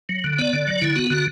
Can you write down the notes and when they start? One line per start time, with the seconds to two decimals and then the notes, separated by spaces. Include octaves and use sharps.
0.09 F#3
0.24 D3
0.38 B3 D5
0.53 D3
0.67 F#3
0.81 D3 E4
0.96 B3 F#4
1.10 D3 F#4